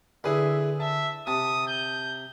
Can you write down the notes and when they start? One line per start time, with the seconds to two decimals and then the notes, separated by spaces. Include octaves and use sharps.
0.24 D3 E4 G#4 B4 E5
0.80 E5 A5
1.27 C3 A5 D#6
1.67 G6